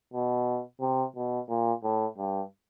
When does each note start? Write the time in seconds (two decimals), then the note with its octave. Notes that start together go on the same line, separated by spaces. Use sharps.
0.14 B2
0.81 C3
1.16 B2
1.49 A#2
1.83 A2
2.18 G2